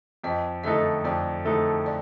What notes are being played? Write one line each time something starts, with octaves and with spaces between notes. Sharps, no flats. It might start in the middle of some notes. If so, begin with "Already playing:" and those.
F2 D#5
D3 A3 D#4 A4 D#5
F2 D5
D3 A3 D#4 A4
D5